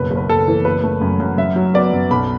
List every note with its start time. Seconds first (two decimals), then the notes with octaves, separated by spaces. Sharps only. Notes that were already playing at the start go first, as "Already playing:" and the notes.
Already playing: F#1 B1 B4
0.11 F#1
0.17 B4
0.29 F#1 A4
0.48 E3
0.65 F#1 B4
0.83 A3
1.01 F#2
1.20 F#2
1.38 F#2 E5
1.56 F#3
1.74 B3 D5
1.93 F#2
2.11 B1 B5